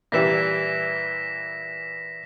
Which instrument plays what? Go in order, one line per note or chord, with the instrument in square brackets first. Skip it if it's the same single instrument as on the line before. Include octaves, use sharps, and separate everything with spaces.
[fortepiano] A#2 E3 G3 [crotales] A#6 B6 E7